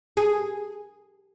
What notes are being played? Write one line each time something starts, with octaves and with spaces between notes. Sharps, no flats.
G#4